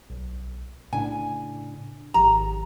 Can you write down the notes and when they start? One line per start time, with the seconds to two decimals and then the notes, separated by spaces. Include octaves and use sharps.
0.10 B1
0.93 A2 C#3 D4 G#5
2.14 G#1 F3 G4 A#5